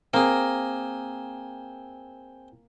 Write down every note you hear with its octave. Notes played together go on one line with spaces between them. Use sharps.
A#3 C4 G#4